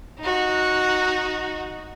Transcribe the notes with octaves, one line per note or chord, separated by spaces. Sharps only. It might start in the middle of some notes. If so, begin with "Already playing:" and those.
D#4 F#4